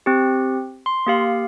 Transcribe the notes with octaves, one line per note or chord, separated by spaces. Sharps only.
C4 G4
C6
A#3 G4 F5